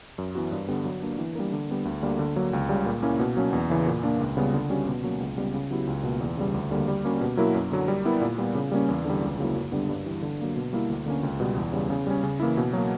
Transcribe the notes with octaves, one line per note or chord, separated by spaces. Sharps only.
F#2
E3 B3 F#4
G2
D3 G3 B3
F#3
A#3 D4
E3
G3 A#3 D4 A#4
D3
G3 B3 D4
D2
D3 G3 A#3
D3
F#3 A#3 D4
C#2
C#3 G3
A#2
A#3 C#4 E4
B2
F#3 A#3 C#4
E2
C#3 E3
A#2
A#3 D4
C#2
C#3 G3 B3
D3
G3 C#4 F#4
B2
F#3 A#3 C#4
C#2
C#3 G3 B3
C#3
F#3 B3 E4 G4
C#2
B2 A#3
E2
C#3 G3
D2
D3 G3 A#3
G3
A#3 C#4 F#4
B2
F#3 A#3 E4 A#4
F#2
D3 F#3
G3
B3 E4 A#4
A#2
G3 B3
C#3
G3 A#3 C#4
E2
D3 G3
C#2
C#3 F#3 A#3 E4
F#2
D3 G3 B3 D4
G2
E3 G3
D3
F#3 A#3 D4
B2
G3 A#3 E4
D2
D3 A#3 C#4
C#2
B2 G3 B3
E2
C#3 G3
C#3
G3 C#4
C#3
E3 A#3 E4
B2
F#3 A#3